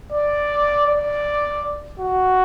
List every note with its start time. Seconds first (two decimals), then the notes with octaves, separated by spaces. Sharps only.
0.11 D5
0.87 D5
1.99 F#4